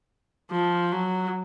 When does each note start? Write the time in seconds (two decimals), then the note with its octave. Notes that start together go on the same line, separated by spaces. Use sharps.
0.51 F3
0.92 F#3